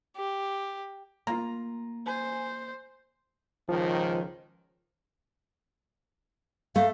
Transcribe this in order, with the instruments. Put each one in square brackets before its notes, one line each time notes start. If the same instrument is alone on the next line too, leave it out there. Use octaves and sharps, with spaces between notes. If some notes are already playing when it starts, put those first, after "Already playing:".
[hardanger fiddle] G4
[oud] A#3 [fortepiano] F4 A#5
[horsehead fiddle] C5 [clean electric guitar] G#5
[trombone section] C#2 G#2 D#3 [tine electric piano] F3
[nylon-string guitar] A3 [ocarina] F5